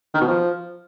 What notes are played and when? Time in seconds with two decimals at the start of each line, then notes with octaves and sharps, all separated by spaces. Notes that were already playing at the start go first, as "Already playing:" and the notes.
0.14 D#3
0.21 B2
0.28 F3